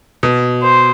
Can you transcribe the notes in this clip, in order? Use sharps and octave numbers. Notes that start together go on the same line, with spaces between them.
B2
C5